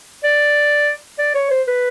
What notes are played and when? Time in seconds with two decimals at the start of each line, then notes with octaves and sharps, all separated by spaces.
0.24 D5
1.19 D5
1.35 C#5
1.51 C5
1.68 B4